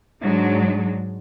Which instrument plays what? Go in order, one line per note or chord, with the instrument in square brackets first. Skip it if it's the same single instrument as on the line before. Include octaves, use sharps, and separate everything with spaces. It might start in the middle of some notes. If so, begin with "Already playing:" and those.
[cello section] G#2 F#3 G#3 D4